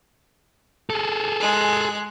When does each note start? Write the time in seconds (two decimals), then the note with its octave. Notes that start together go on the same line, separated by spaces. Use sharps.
0.90 G#4 A4
1.40 G#3 F#6